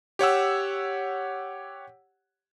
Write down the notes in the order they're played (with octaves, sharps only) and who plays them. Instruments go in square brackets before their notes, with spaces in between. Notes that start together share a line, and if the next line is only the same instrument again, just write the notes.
[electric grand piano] G4 C#5 F#5 E6